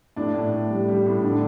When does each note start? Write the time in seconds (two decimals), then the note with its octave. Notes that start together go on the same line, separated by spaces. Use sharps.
0.16 A2 D4
0.34 A2
0.52 A2
0.70 G3
0.88 G3
1.06 A2
1.24 D3 D4